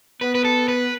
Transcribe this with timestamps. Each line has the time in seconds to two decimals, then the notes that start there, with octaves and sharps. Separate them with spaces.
0.21 B3 B4
0.35 B4
0.44 A4
0.68 B4